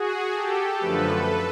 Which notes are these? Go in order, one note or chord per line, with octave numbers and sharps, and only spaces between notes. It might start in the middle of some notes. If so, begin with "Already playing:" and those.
Already playing: F#4 G#4
G4 A4
F#2 D3 F3 A3 A4 B4